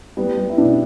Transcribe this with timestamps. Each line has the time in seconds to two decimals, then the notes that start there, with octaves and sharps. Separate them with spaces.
0.17 G3 B3
0.37 G3
0.49 E4
0.58 B2 D4